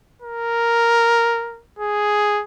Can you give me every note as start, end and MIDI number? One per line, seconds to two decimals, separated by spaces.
0.22 1.62 70
1.79 2.43 68